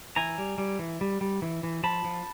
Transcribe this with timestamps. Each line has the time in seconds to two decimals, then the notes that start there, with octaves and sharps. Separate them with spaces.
0.16 E3 G#5 A#5
0.38 G3
0.58 G3
0.79 E3
1.01 G3
1.21 G3
1.42 E3
1.63 E3
1.84 F3 A5 B5
2.04 F3